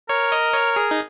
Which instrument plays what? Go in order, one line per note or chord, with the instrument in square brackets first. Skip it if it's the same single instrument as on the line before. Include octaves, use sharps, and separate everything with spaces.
[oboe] A#4 [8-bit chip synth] C#5
[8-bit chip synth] D#5
C#5
G#4
D#4